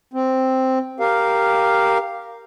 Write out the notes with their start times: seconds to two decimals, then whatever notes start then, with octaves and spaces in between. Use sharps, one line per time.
0.13 C4
1.00 G4 A#4 F5